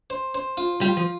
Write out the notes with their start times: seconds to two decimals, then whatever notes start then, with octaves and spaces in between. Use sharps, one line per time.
0.10 C5
0.35 C5
0.57 F4
0.81 G3 F4
0.97 F3